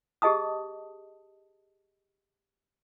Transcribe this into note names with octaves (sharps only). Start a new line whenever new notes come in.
G4 G#4 D#5 A5 D#6